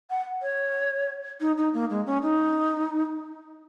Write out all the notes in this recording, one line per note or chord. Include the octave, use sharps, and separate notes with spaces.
F#5
C#5
D#4
D#4
A#3
G#3
C#4
D#4